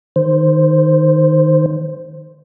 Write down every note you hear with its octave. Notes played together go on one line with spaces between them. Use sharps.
D#3 C5